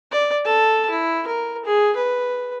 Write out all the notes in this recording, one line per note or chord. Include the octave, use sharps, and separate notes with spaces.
D5
A4 A5
E4
A#4
G#4
B4